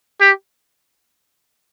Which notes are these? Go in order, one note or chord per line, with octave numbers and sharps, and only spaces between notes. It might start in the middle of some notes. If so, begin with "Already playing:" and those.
G4